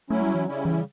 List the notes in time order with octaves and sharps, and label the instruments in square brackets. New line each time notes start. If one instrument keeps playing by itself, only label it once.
[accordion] F#3 C#4 E4 [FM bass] A3
[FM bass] G3
E3
[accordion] C#3 G3 C#4 E4
[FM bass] E3